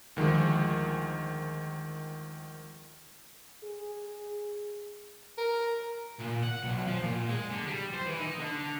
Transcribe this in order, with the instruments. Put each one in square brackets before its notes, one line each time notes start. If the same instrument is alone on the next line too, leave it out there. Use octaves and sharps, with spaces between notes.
[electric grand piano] D2 D#3 F3 G#3
[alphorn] G#4
[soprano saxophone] A#4
[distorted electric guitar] A#2
F#5
B1
F3
A#2
G#3
D3
G3
C5
E3
D#4
D3